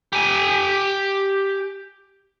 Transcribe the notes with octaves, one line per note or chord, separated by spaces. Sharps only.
G4 G#5